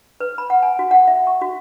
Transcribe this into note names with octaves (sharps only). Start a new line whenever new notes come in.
B4
B5
F#5
G#5
F#4
F#5
E5
C#6
F#4